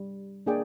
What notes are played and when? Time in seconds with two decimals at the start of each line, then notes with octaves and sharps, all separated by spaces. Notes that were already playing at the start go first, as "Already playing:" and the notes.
Already playing: G3
0.46 A#3 D4 G#4 D5 G5